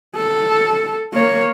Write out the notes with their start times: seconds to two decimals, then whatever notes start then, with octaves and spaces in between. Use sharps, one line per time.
0.16 A4
1.14 A#3 C#5